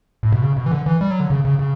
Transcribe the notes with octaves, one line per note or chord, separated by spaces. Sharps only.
A2
B2
C#3
B2
E3
D3
E3
G3
F#3
D3
C#3
C#3
C#3